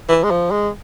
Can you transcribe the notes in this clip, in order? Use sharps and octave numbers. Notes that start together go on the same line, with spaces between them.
E3
G#3
F3
G#3